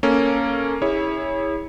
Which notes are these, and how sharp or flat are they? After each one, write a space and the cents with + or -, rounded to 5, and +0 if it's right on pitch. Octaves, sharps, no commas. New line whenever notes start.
A#3 +0 C#4 +0 A4 +0
E4 -25 G#4 -35 C#5 +0